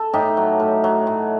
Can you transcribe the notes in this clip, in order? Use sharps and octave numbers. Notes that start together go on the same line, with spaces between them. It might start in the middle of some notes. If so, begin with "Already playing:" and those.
Already playing: A4
A2 D#4 G4
F#3
A2
F#3
A2